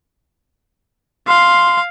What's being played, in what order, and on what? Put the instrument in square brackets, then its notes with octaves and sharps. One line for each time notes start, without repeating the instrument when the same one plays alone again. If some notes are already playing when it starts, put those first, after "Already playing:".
[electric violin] F5 [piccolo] C6